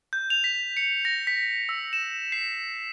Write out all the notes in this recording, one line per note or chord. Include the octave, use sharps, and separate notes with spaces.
G6
F7
B6
C#7
A#6
B6
E6
E7
C7